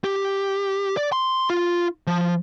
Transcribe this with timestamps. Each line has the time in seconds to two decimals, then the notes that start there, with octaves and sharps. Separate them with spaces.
0.04 G4
0.97 D5
1.12 C6
1.50 F4
2.07 F3